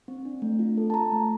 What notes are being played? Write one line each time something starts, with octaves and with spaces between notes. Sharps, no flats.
C4
D4
A3
F4
A4
A5
A4 A#5
A3